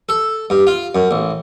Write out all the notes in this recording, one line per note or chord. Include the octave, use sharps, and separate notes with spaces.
A4
G2
F4
F#2
A1